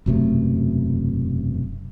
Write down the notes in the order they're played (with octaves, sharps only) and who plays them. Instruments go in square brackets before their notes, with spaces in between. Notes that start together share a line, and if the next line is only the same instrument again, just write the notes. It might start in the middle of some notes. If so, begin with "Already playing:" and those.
[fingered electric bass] E1 F#2 C3 A3